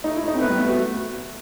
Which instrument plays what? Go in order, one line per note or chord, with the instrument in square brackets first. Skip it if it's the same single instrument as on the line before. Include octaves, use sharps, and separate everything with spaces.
[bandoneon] A3 [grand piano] D#4
[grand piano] E4
[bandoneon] A3
[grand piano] D#4
C4
[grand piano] B3 [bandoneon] B4
[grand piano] G3
[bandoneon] A3 [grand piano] B3
[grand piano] F#4